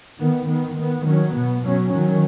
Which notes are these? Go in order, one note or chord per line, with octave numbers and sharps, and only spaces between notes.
D#3 B3
D#3 B3
D#3 B3
D#3 F#3 C#4
B2 B3
B2 F#3 C#4
D#3 F#3 C#4